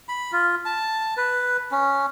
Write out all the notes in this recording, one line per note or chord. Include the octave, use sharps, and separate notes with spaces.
B5
F4
A5
B4
C#4